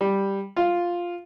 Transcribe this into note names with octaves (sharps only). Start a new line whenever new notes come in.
G3
F4